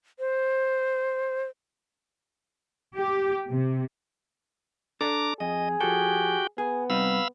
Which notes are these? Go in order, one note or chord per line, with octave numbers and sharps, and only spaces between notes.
C5
G4
C3
D4 A4 D5 A#5 D6
F2 G#4 D#5
F3 F#4 G4 A4 G5
B3 G#4
C3 G3 D#4 F5 B5 E6